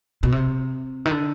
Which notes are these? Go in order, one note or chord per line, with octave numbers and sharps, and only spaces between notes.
B2
C3
D#3
D3